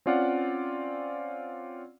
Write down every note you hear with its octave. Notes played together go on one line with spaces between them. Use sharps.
C4 C#4 F4 D5 F5 F#5